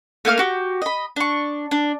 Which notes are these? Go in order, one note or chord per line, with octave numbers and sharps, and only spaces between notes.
A3 A#3 F5 F6
F#4 G4
D#5 B5
D4 C#6
D4